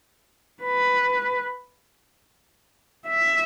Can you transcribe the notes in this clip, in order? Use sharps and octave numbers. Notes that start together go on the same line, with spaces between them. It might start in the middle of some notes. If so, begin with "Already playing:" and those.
B4
E5